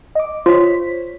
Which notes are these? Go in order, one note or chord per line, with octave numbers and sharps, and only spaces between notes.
D#5 D6
F4 C5 C#5 B6